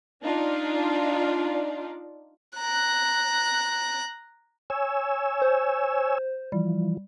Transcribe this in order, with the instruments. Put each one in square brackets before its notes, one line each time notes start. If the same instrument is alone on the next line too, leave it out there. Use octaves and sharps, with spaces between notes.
[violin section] D4 D#4 F4 D5
[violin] A#5 F#6
[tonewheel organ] C#5 G#5 E6
[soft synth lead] C5
[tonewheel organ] E3 F3 [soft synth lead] G3